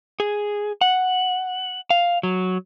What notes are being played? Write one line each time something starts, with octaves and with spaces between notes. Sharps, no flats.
G#4
F#5
F5
F#3